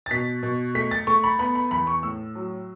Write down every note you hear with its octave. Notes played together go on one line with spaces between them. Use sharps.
A6
B2 B6
B2
A3 B6
A6
A3 C#6
B5
B3 B5
B5
E2 B5
C#6
A2 E6
F#3